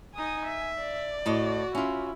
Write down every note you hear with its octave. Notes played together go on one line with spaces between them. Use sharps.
D#4 G#5 D#6
E5
D5
A2 F#4 A4 D#5
C#4 E4 F4